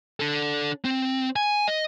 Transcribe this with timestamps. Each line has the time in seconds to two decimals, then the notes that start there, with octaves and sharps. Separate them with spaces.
0.20 D4 A4
0.85 C4
1.36 G#5
1.68 D#5